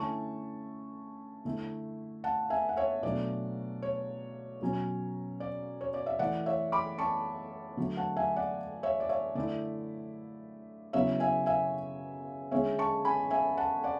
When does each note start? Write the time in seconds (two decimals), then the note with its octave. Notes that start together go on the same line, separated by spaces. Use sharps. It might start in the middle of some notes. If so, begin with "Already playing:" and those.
Already playing: D3 A3 C#4 E4 A5 C#6
1.45 D3 A3 E4
2.24 F#5 A5
2.50 E5 G#5
2.69 F#5
2.77 C#5 E5
3.03 B2 F#3 A3 D4 D5
3.82 C#5
4.61 B2 F#3 C#4
5.40 D5
5.81 C#5
5.94 D5
6.06 E5
6.19 E3 A3 E4 D5 F#5
6.46 C#5 E5
6.72 B5 D6
6.98 A5 C#6
7.77 D3 F#3 A3
7.97 F#5 A5
8.17 E5 G#5
8.36 D5 F#5
8.83 C#5 E5
9.00 D5
9.09 C#5 E5
9.35 D3 A3 E4 D5
10.93 C#3 F#3 B3 E4 C#5 E5
11.20 E5 G#5
11.46 E5 G#5
12.51 D3 G#3 C#4 C#5 E5
12.79 A5 C#6
13.05 G#5 B5
13.31 E5 G#5
13.57 F#5 A5
13.83 D5 F#5